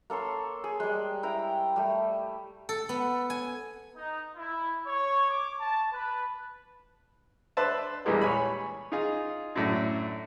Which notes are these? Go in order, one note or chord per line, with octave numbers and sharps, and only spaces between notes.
A#3 A4 C#5 C6
G#4
G3 G#3
E4 G5 A#5
G3 A3
A4
B3
G#5
D#4
E4
C#5
D6
A5
B4
D4 B4 C5 E5 A5
A#1 E2 E3 G3 G#3 A#3
C#5 G#5 B5
D#4 F4 G#4
F#2 A2 D4